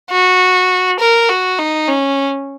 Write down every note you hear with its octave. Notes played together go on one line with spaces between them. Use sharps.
F#4
A#4
F#4
D#4
C#4